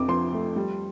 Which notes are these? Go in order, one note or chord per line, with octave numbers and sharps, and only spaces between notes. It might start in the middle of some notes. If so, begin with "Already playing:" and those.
Already playing: F2 C3 D6
F3 C6
A3
G3